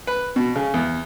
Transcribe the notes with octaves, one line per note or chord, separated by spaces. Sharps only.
B4
B2
C#3
E2